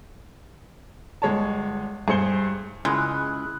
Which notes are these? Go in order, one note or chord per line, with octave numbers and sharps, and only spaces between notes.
G1 G#3 C#5 A5
G2 G#4 C5 C#7 G7
C#2 G#3 E4 D#6 F#6